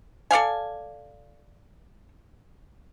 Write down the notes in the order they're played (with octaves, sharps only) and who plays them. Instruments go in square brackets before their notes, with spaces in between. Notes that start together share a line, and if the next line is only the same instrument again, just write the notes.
[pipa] A4 D5 F5 G#5